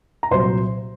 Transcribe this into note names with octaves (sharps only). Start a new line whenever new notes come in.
A#5
C2 A#2 F#3 C5 C6